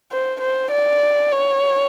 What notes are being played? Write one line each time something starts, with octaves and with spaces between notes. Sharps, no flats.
C5
C5
D5
C#5